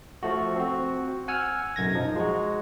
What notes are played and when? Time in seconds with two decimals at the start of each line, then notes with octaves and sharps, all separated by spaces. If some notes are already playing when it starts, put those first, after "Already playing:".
0.23 F3 A3 F#4
0.56 C4 F#4
1.28 F#5 G#5 E6 F6
1.76 B1 F#2 G#6 A#6
1.95 F3 D#4
2.16 G#3 F#4